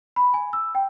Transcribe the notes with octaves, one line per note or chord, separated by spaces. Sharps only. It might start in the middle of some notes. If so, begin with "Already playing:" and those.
B5
G#5
E6
G5